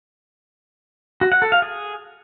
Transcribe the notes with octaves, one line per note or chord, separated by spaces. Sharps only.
F#4
F#5
A4
F5
G#4